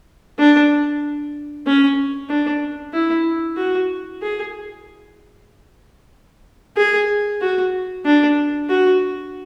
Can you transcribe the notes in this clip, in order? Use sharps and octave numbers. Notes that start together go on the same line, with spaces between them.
D4
C#4
D4
E4
F#4
G#4
G#4
F#4
D4
F#4